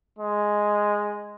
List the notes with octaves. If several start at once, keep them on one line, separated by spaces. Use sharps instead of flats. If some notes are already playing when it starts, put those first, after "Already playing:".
G#3